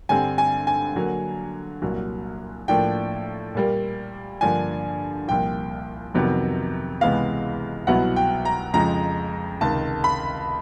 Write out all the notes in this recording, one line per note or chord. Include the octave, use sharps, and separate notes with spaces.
G2 D3 G3 C4 G#5
G#5
G#5
D3 F#3 A#3
C2 A#2 F#3
A2 F3 A#3 D4 G5
A#2 G3 A#3
G2 D3 F3 A#3 D4 G#5
C2 A#2 F3 G5
F2 C3 D#3 F#3 B3
C#2 C3 E3 G#3 B3 F5
C2 B2 F#3 B3 E4 F#5
G5
A#5
F2 C#3 F3 G#3 A#5
C#2 C3 D#3 A5
B5